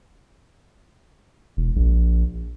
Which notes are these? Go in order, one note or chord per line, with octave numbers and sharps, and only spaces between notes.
E1
A#1